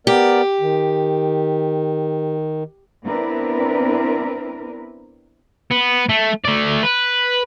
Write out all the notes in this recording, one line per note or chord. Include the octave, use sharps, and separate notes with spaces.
B3 G4 A#4 D5
D#3
B3 C4 D4 E4 A#4 B4
B3
A3
A3 D5
B4